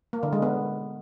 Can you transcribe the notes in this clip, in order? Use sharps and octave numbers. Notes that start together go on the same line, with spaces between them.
A#3
D3
G#3
B3